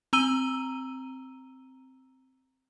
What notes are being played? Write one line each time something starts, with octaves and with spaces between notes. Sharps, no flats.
C4 A#5 E6 D#7 G7